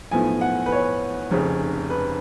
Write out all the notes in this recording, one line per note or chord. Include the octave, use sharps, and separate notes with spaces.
B1 A2 F3 B3 G#5
F#5
B4
C#5
F1 F2 C#3
B4